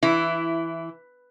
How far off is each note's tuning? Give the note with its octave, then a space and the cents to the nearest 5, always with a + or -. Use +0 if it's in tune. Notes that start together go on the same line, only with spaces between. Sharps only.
E3 +0 E4 +15